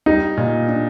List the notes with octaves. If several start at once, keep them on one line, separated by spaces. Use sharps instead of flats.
G3 D#4
A#2
D4